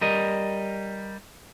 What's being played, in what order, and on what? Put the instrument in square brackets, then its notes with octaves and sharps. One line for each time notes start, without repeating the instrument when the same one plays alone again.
[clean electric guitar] G3 A#4 D#5